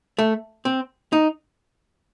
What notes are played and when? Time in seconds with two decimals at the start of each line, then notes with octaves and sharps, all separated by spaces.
0.19 A3
0.65 C4
1.13 D#4